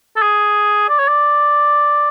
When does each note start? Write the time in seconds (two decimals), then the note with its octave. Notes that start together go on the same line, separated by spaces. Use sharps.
0.16 A4
0.22 G#4
0.89 D5
0.99 C#5
1.08 D5